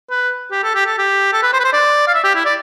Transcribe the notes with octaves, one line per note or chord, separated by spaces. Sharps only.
B4
G4
A4
G4
A4
G4
A4
B4
C5
B4
C5
D5
F5
E5
G4
E4
D5